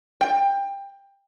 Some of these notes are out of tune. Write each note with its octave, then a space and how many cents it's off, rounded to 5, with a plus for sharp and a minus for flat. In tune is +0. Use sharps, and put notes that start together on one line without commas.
G5 +20